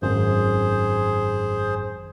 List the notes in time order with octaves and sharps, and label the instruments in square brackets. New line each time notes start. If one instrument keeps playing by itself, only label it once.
[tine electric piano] G#1 F#2 [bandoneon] G#4 C5